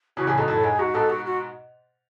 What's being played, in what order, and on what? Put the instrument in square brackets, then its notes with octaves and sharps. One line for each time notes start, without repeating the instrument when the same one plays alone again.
[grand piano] C#3 E3 [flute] F#4
[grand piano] A2 C#3 [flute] G#4
[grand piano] G#2 B2 [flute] A4
[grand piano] F#2 A2 [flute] A4
[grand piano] G#2 [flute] G#4
[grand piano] G#2 [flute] F#4
[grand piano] G#2 B2 [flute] A4
[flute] F#4
F#4